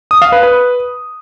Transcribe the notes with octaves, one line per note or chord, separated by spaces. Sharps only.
D#6
F5
B4
B4